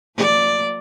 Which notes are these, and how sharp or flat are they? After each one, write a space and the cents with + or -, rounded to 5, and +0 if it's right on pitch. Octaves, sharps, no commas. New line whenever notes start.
F3 +25 A#3 -30 D5 +0